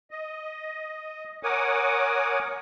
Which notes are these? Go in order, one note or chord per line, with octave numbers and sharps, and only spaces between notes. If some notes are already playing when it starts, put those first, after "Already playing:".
D#5
A#4 C#5 F#5 G#5 D6 D#6